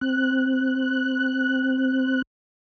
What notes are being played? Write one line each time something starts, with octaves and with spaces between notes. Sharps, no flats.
C4 F#6